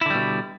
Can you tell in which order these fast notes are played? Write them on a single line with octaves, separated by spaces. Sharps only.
E4 D3 G3 B2